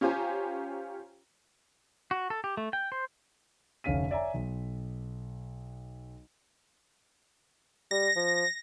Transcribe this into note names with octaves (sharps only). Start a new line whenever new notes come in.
C#4 F4 G4 C5 G#5 A#5
F#4
A4
G4
A3
G5
C5
F1 D2 C#4 F5 B6 D#7
C#5 D5 E5 G#5 A#5
B1
G3 A#6
F3